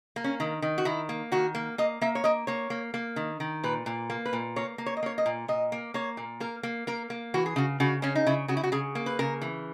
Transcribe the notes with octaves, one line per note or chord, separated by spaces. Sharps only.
A#3
C#4
D#3
D#3
F#4
D#3 E4
A#3
D#3 F#4
A#3
A#3 D#5
A#3 E5
C#5
A#3 D#5
A#3 C#5
A#3
A#3
D#3
D#3
A#2 B4
A#2
A#3
B4
A#2
A#3 C#5
A#3
C#5
D#5
A#3 C#5
D#5
A#2
A#2 D#5
A#3
A#3 C#5
A#2
A#3 A#4
A#3
A#3 A#4
A#3
E3 F#4
G#4
C#3 F#4
C#3 F#4
C#3 C#4
D#4
C#3 E4
C#3 F#4
E4
F#4
C#3 G#4
A#3
B4
C#3 A#4
E3